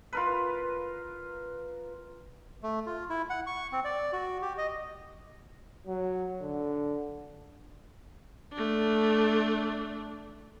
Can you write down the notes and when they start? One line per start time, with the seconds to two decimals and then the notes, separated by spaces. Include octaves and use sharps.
0.13 F4 A#4 B4
2.63 A3
2.86 F4
3.10 E4
3.30 F#5
3.47 C#6
3.72 C4
3.85 D5
4.13 F#4
4.42 G4
4.58 D#5
5.87 F#3
6.42 D3
8.53 A3 D4